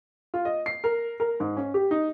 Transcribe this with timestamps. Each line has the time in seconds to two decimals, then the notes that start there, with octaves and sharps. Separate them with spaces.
0.34 F4
0.45 D#5
0.66 C7
0.84 A#4
1.20 A#4
1.40 G#2
1.57 C#4
1.74 G4
1.91 D#4